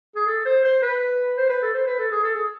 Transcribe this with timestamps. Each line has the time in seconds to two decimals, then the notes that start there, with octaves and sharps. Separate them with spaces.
0.16 G#4
0.27 A4
0.46 C5
0.64 C5
0.82 B4
1.37 C5
1.49 B4
1.62 A4
1.74 C5
1.86 B4
1.99 A4
2.11 G#4
2.23 A4
2.35 G#4